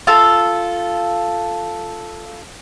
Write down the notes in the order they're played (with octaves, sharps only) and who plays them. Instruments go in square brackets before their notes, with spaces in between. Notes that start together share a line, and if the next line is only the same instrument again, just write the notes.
[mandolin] F4 A4